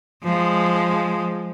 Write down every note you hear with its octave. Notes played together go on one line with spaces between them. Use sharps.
F3 G#3